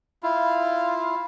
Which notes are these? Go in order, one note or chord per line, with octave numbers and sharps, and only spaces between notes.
E4 F4